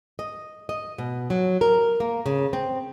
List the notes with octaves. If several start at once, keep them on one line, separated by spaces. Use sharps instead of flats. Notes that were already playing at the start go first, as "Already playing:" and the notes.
D#5
D#5
B2
F#3
A#4
A#3
C#3
C4